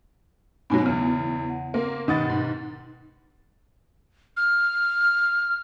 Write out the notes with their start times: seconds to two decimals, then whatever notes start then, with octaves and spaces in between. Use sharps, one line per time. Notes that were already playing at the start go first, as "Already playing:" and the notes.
0.70 G#2 B2 F#3 B3 G#5
0.86 E2 C#3
1.50 F#5
1.74 A#3 C4
2.08 G2 B2 D#3 D#5 F#5 A6
2.29 G#2
4.37 F6